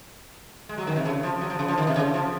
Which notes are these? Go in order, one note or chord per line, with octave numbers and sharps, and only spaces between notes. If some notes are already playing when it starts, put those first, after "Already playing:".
G#3
F#3
D#3
C3
C#3
F3
F#3
F3
C#3
F3
D#3
C3
C#3
F3